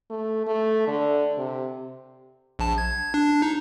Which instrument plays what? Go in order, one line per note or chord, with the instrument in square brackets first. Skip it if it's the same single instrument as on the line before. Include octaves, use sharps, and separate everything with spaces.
[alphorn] A3
A3
D3
C3
[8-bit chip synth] A#1 A5
G#6
D4
D#4